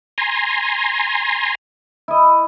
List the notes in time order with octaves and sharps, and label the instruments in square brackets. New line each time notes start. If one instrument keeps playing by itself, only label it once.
[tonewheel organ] G#5 A#5 C6
[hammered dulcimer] E4 D#5